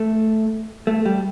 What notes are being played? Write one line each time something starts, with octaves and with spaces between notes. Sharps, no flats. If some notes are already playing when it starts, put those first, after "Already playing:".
Already playing: A3
A3
G3